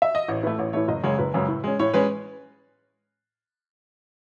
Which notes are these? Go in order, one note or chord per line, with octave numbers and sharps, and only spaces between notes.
E5
D#5
A1 C#5
A2 E3 A3 B4
A1 C#5
A2 E3 A3 C#5
F#1 D#5
F#2 C#3 G#3 C#4 C#5
F#1 B4
F#2 C#3 G#3 C#4
A2
G#3 C#4
A2 C#5
G#3 C#4 B4